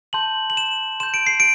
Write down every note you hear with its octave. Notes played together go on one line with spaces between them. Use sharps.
A5 C6 G6 F#7
F#7
E7
C6 G6 E7
D7
C7
D7